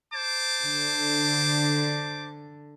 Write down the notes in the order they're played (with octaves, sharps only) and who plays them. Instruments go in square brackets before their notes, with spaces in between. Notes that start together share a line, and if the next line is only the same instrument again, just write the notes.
[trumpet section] C5 A5 D6
[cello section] D3